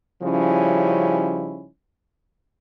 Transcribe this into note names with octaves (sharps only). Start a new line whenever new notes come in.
C#3 F3 G3 C#4 D#4 E4